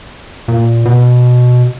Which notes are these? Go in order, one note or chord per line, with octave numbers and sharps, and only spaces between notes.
A#2
B2